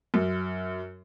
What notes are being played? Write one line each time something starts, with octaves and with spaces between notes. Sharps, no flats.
F#2